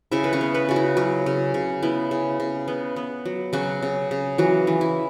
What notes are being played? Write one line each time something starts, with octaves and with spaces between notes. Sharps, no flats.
C#3 E4 E5
B4
C#4 C#5
B3
B3 B4
C#3 F#4
E4
F#3 C#4
C#3
C#3
B3 E4
C#3
C#3
B3
B3
F#3
C#3 F#3 F#4
C#3
C#3
E3 F#3 F#4
E3
E4